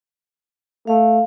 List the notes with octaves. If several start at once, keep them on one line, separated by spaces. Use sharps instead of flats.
A3 F5